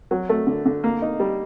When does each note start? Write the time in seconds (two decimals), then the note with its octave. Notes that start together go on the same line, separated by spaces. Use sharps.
0.11 F#3
0.29 A3
0.47 D3
0.65 D3
0.84 A#3
1.02 D#4
1.20 G3